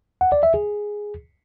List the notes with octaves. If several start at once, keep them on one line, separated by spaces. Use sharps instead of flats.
F#5
D5
E5
G#4